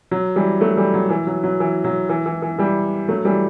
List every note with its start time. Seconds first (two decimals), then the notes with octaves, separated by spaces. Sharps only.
0.11 F#3
0.36 E3 G3
0.61 F#3 A3
0.77 E3 G3
0.94 F#3
1.10 E3
1.27 F#3
1.44 F#3
1.60 E3
1.84 F#3
2.09 E3
2.26 E3
2.42 E3
2.58 E3 G3
3.08 F#3 A3
3.25 E3 G3